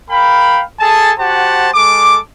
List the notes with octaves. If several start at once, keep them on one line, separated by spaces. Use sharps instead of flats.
A#4 F5 G5 B5
G#4 A4 G#5 A5
F#4 G4 C5 F#5 A5
G#3 A4 D6